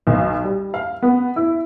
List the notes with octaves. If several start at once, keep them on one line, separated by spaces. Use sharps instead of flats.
B1
G3
F5
B3
E4